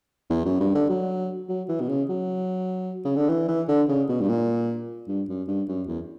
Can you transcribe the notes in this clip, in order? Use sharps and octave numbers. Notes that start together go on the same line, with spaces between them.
E2
F#2
G2
D3
F#3
F#3
E3
B2
C#3
F#3
C#3
D3
E3
E3
D3
C#3
B2
G2
A#2
G2
F#2
G2
F#2
E2